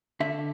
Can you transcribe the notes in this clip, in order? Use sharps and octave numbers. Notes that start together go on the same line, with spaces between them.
D3 E5